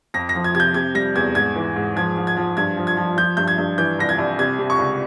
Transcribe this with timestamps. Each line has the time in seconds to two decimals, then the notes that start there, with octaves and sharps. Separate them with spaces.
0.14 F2 A#6
0.29 A#6
0.35 F3
0.44 G#6
0.55 C3 G#6
0.60 G6
0.74 C3 G#6
0.95 G3 A#6
1.15 E2 G#6
1.35 G#2 G#6
1.56 E3
1.76 G#2
1.96 F3 G#6
2.17 F3
2.27 G#6
2.37 F3
2.57 G2 G#6
2.77 F3
2.87 G#6
2.97 F3
3.17 F3 G6
3.37 G2 G6
3.48 G#6
3.58 G2
3.78 E3 G6
3.99 C2 A#6
4.09 G#6
4.18 C2
4.39 C3 G#6
4.59 C3
4.70 C#6
4.79 C#2